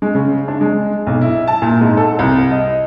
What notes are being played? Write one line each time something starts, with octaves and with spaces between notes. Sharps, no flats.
G#3
C#3
D4
G#3
B1
E4
A5
A#2
G#2
A4
C2
D#5